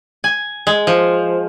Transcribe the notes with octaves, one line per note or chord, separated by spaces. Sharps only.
G#5
G#3
F3